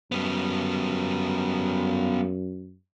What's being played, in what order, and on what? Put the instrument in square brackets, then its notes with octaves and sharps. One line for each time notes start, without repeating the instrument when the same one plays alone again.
[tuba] F#2 [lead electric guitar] G3 B3